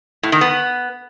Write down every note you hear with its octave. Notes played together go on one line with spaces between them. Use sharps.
A2
D#3
B3